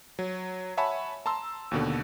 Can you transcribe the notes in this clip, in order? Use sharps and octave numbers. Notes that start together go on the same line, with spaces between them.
F#3
C#5 E5 F#5 G#5 A5 B5
A5 A#5 C6 E6
D#2 B2 D3